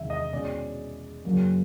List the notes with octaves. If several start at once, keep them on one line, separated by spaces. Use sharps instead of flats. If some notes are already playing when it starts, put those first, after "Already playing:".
Already playing: E2 C3 D#3 G#3 E5
D#5
B2 G#3 C#4 D5
F#2 C#3 F#3 A#3